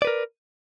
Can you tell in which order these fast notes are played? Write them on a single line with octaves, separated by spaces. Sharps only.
D5 B4 A#4